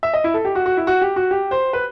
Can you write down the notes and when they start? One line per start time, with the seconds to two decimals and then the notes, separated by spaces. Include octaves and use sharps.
0.03 E5
0.14 D#5
0.24 E4
0.34 A4
0.45 G4
0.55 F#4
0.66 F#4
0.77 E4
0.87 F#4
1.02 G4
1.16 F#4
1.31 G4
1.51 C5
1.73 B4